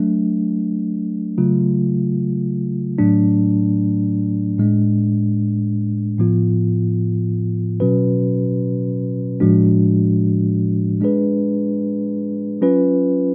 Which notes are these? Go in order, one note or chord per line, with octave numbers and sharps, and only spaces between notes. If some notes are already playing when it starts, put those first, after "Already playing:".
Already playing: F#3 A3 D4
C#3 F#3 A3 F4
A2 F#3 A3 D4
A2 G#3 D4
A2 F3 B3 F4
B2 F#3 C#4 F#4 B4
A2 F3 G#3 D4 F#4
G#3 D4 G#4 B4
F#3 C#4 F4 B4